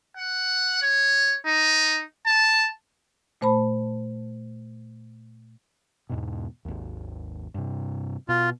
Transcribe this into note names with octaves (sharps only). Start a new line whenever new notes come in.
F#5
C#5
D#4
A5
A#2 A3 C5 A5 B5
E2 G#2 B2
G#1 D#2
G2 C3
B2 F4